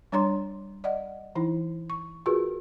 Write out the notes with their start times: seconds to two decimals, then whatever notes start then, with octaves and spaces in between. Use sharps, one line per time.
0.12 G3 D4 C#5 A#5 C6
0.84 D5 D#5 F#5
1.35 E3 D#4 E4
1.90 C#6
2.26 F4 F#4 G#4 A#4 B4